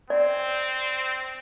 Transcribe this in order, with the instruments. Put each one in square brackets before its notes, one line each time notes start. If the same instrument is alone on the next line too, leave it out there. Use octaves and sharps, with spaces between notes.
[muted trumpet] C4 [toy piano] D5